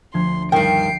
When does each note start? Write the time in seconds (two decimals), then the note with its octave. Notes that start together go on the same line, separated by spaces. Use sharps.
0.14 D2 F3 C6 G#6
0.52 G2 D#3 G5 C7 D7